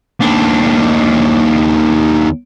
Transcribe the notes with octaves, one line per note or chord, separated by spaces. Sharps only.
D#2 D4